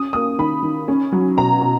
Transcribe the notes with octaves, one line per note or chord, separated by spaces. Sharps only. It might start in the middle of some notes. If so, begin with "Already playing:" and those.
Already playing: C#4 D#6
A#3 D#6
D#3 B5
D#3
C#4
F#3
B2 A#5
B2